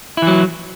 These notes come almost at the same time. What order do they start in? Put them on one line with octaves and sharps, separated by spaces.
E4 E3 F#3